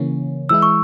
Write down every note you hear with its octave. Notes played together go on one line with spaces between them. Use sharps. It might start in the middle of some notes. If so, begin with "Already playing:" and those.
Already playing: C#3 E3 A#3 C#4
E3 G#3 E4 E6
C#6